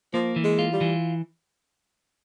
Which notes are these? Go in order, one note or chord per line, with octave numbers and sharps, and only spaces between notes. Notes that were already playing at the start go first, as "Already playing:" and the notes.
F3 A#3
E3
G#3
F4
G3
E3